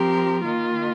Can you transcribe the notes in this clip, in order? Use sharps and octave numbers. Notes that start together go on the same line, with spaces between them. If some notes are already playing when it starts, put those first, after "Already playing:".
Already playing: F3 C4 G4 A#4
D#3 A#3 F4